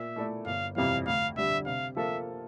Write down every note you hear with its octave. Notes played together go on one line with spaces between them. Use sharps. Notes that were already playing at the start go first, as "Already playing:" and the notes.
Already playing: A#2 E5
A3 E4 A4 D5
G1 F5
F2 C3 E3 G3 F5
D2 F5
D3 G3 E5
C3 F5
F3 A#3 F4 A4 E5